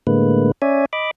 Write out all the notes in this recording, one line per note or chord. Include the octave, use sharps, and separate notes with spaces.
A2 D3 G#3 A#3 B4
C#4 C#5 D5 E5 G#5
D#5 B5 D6